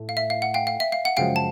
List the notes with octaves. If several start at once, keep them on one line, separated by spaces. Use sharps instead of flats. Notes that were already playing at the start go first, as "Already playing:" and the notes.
Already playing: A2 A3
F5
E5
F5
F#5
F5 G5
F5
E5
F5
F#5
F#2 C#3 F3 G#3 F5 G5
A5